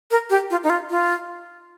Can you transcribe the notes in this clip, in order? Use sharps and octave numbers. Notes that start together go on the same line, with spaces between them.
A#4
G4
F4
D#4
F4
F4